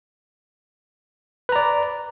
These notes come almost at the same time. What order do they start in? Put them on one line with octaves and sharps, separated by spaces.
B4 A#5 D5